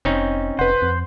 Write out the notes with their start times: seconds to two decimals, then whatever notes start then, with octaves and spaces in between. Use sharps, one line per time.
0.05 F1 C4 C#4 D#4
0.59 F1 B4 C5 F#5
0.82 F2